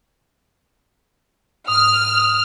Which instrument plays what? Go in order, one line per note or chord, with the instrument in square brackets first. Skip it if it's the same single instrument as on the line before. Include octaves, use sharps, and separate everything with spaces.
[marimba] G#2 [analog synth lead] D#6 [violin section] F6